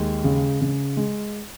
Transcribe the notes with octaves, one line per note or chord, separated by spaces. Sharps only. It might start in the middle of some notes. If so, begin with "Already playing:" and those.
Already playing: D#2 G#3
C#3
C#3
G#3